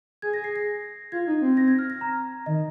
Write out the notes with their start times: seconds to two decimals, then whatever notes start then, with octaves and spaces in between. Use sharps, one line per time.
0.22 G#4 G#6
0.33 A#6
0.44 C7
0.56 A#6
1.12 F4 G#6
1.27 D#4
1.41 C4
1.57 A#6
1.68 G#6
1.79 F6
1.90 A#6
2.01 A#5
2.46 D#3 D#5